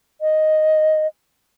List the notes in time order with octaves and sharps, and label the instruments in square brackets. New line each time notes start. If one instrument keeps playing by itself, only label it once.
[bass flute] D#5